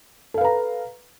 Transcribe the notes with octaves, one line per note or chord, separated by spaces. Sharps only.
A4 B4 F5 A#5